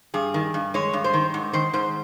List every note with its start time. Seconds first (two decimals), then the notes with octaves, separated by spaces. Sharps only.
0.14 G2 G#4
0.34 D#3
0.54 G2
0.74 G#3 C#5
0.93 G2
1.04 C5
1.14 D#3
1.34 G#2
1.53 D#3 C5
1.73 G#2 C5